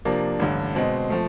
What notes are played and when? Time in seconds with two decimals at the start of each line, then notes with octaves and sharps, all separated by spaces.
0.05 C3 F3 A#3 D4
0.39 A1 G2 D3
0.75 B2 G#3 C4
1.10 F3 A3